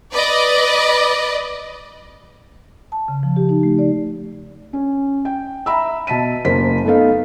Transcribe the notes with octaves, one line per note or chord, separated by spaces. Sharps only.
B4 D5 D#5
A5
C#3
F3
G4
D#4
A3
D5
C#4
G5
E5 A#5 B5 E6
B2 A5 B6 D#7
F#1 A#3 C5 B6
A3 B3 D#4 A4 F5